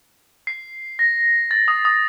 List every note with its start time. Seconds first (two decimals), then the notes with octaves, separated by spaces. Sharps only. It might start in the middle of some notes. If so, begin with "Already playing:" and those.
0.47 C7
0.99 A#6
1.51 A6
1.68 D#6
1.85 D#6